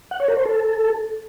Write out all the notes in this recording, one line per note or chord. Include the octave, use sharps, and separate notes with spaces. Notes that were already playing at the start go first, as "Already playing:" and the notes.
F#5
C#5
A#4
C5
A4